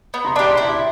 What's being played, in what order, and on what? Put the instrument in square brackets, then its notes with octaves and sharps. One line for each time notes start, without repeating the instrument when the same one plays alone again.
[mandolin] B3
[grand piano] A#5 C6
[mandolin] D4 [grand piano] A5 B5
[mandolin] G4
[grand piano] A#5 C6
[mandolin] E4